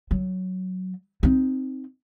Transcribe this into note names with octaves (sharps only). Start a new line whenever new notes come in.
F#3
C4 D#4